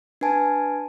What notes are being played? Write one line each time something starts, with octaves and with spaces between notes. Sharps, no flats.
D4 B4 G#5 A5